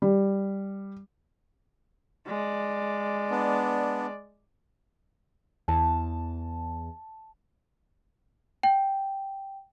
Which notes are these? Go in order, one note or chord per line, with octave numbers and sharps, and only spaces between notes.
G3
G#3 D5
B3 D4
E2 A5
G5